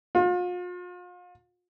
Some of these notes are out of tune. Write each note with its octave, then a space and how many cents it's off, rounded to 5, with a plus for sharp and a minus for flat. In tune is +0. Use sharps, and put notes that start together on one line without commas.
F4 +40